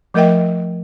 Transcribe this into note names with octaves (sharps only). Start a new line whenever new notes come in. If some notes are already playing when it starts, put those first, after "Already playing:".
F3 A3 A#4 D#5 E5 G5